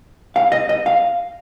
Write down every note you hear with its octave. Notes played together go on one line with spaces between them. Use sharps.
F5
D#5
D#5
F5